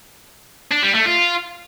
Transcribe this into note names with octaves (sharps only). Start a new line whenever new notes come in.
D4
G3
A3
F4